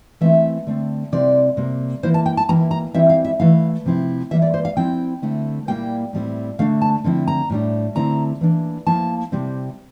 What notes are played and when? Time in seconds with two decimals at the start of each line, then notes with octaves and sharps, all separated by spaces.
0.21 E3 A3 C4 E4 E5
0.67 D3 A3 C4
1.12 C3 G3 C4 E4 D5
1.57 C3 G3 A#3
2.03 E3 A#3 E4 C5
2.14 A5
2.26 G5
2.37 A5
2.49 E3 A#3 E4 A#5
2.71 A#5
2.94 E3 G3 C4 E4 E5
3.10 F5
3.25 E5
3.40 E3 A3 E4 F5
3.85 C3 F3 C4 E4
4.31 E3 G3 A#3 E5
4.42 D5
4.54 C5
4.65 F5
4.77 F3 C4 E4 G5
5.22 D3 A3 C4 E4
5.67 A#2 G3 A#3 E4 G5
6.13 A2 G3 C4 E4
6.59 D3 A3 D4 F5
6.82 A5
7.04 D3 F3 C4 E4
7.28 A#5
7.50 A2 G3 D4
7.95 D3 A3 C4 E4 A#5
8.41 E3 A#3 D4
8.87 F3 A#3 E4 A5
9.32 C3 G3 C4 E4